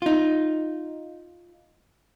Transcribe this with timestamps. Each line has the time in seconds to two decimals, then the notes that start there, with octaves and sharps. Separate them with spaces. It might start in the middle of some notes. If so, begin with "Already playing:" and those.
0.02 D#4 F4